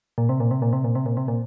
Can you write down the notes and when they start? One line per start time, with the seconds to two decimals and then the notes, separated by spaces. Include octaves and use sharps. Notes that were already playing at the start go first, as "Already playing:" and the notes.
0.18 A#2
0.29 C3
0.40 A#2
0.51 C3
0.62 A#2
0.73 C3
0.84 A#2
0.95 C3
1.06 A#2
1.17 C3
1.28 A#2